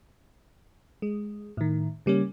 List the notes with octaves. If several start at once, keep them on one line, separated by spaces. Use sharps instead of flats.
G#3
A2 D#3
C#3 G3 A#3 C#4